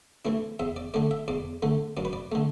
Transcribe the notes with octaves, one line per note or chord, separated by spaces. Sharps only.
E3 A3 D4
E2 E5
D5
D3 A3 D5
E5
E2 D5
D3 A3
F#2 D5
B4
D5
D3 A3